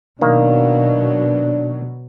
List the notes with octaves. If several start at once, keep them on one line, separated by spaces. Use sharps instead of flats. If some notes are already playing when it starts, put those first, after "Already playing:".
B2 D#3 F#3 A#3 D4